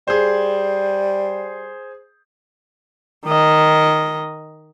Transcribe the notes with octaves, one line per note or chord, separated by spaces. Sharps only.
G3 G#4 C5
D#3 D#5